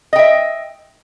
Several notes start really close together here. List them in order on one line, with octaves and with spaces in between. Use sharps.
D#5 G5 E5